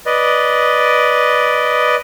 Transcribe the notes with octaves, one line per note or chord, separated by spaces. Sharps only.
B4 D5 D#5